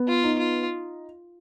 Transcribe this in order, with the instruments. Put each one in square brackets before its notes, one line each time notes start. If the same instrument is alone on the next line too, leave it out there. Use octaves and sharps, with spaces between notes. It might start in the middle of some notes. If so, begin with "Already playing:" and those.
Already playing: [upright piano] B3
[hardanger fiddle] F4
[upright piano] D#4
[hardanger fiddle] F4